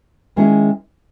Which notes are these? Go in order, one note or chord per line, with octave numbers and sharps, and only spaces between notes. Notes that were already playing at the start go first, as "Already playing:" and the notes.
D#3 G#3 C#4 E4 G#4